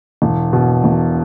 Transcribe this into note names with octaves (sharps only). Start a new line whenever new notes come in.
E1
B2
E1